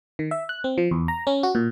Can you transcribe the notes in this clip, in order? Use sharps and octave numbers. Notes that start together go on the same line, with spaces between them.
D#3
E5
F#6
C4
F3
E2
A#5
C#4
F#4
A#2